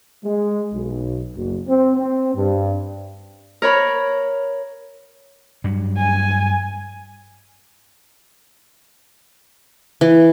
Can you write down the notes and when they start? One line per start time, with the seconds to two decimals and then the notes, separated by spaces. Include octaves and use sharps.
0.24 G#3
0.73 B1
1.35 F#1
1.67 C4
1.98 C4
2.35 G2
3.62 A#4 C#5 B5
5.64 G2 F#3
5.97 G#5
10.01 E3